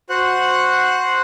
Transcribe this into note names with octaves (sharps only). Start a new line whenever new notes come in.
F#4 C5 F#5 F#6